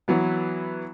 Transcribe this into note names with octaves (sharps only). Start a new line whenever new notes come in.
E3 F#3 B3